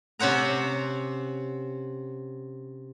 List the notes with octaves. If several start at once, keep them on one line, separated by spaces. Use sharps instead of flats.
C3 C#4 C5 F#5 A#5